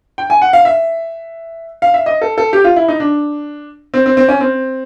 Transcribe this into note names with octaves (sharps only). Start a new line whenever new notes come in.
G5
G#5
F#5
F5
E5
F5
E5
D#5
A4
A4
G4
F4
E4
D#4
D4
C4
C4
C4
C#4
C4